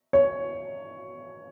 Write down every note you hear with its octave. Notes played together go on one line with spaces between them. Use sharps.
C#5